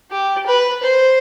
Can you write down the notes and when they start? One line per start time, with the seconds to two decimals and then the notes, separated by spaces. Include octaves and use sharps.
0.11 G4
0.47 B4
0.83 C5